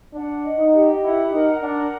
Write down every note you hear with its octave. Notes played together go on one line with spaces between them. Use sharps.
D4 F#5
D#5
D#4
G4
E4 F#5
D#4 A#4
D4 F#5